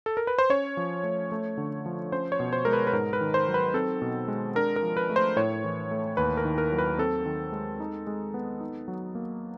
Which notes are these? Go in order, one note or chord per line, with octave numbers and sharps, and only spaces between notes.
A4
A#4
B4
C5
C#4 C#5
F3
A3
A3
D3
F3
C#4 C5
C#5
B2
C5
G#3 A#4
B4
B4
G#2 A#4
B4
D#3
C5
F#3
B4
C4 A4
B2
G#3
D4 A#4
A#4
F3
B4
A3
C5
A2 C#5
E3
A3
D#2 B4
A#4
D#3
A#4
F#3
B4
C4 A4
D#3
G#3
D#4
G#3
B3
D#4
F#3
A#3